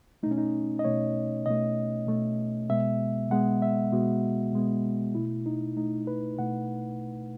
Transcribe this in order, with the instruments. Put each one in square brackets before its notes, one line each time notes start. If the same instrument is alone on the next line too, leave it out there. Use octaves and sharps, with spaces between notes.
[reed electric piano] A3 D#4
B2 C#4
D#4
D#5
B2 A3 C#5
B2 A3 D#5
B2 A3
B2 G#3 B3 E5
B2 G#3 B3 F#5
E5
B2 G#3 B3 F#4
B2 G#3 B3
B2 A3 E4
D#4
B2 A3 D#4
B4
B2 A3 F#5